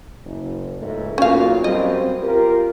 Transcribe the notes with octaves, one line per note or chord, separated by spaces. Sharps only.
F#1
C#2 G#2 A3
B1 A#2 C#4 F#4 F5
F#2 G3 C4 D#5
F4 G4 A#4